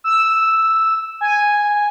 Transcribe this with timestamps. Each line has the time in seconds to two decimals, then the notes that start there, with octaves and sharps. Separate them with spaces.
0.04 E6
1.21 G#5